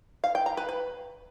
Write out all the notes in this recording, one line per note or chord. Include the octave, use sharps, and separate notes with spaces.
F5
G5
A#5
B4
B4